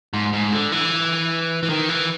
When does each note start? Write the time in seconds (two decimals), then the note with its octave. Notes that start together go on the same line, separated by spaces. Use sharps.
0.13 G#2
0.33 G#2
0.52 D3
0.72 E3
1.63 E3
1.70 D#3
1.89 E3